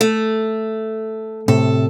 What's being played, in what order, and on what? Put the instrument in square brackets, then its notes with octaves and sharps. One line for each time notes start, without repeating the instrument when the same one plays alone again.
[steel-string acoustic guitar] A3
[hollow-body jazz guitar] A2 C3 [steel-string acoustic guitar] A4